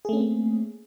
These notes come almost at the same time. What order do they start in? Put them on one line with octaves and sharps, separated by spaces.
G#4 A3 C#4 C4 A#3